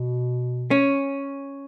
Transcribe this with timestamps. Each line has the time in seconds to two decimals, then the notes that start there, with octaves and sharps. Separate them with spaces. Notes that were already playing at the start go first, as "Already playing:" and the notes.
Already playing: B2
0.71 C#4